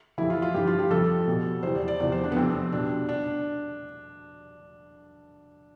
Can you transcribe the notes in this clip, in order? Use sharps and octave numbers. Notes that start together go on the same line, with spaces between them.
F2 E3 G3 E4
F4
F4
G2 F3 G4
F4
G4
F2 C3 F3 A4
B2 G3
E2 C3 E3 G3 C5
D5
D5
E2 C3 F3 D5
C5
D4
B3
F2 C3 F3 C4
B2 G3 D4
D4